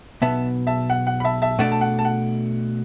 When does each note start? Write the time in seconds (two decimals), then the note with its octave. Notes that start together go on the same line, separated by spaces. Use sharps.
0.22 B1 B2 B3 E5 A5
0.67 E5 A5
0.90 F#5
1.07 F#5
1.20 B5
1.24 E5 A5
1.42 E5 A5
1.59 B2 A3 D4 F#5
1.72 A5
1.81 F#5
1.99 A5
2.05 F#5